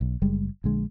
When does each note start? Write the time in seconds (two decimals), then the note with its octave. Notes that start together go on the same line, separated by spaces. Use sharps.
0.01 B1
0.22 F#1 G3 G#3
0.64 A#1 D3 G#3